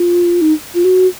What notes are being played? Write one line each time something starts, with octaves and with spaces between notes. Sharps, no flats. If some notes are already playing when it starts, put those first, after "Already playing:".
Already playing: F4
D#4
F4
F#4